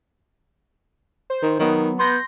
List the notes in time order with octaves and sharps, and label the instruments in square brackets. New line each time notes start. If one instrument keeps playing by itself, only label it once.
[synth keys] C5
[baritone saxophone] D#3
[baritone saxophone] D#3 [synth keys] F#3 B3
[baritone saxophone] B3 [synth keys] C6 G6 A#6